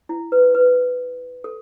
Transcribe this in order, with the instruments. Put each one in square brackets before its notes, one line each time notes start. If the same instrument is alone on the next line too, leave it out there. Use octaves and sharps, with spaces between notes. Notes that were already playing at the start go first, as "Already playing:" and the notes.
[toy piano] E4
B4
B4
A4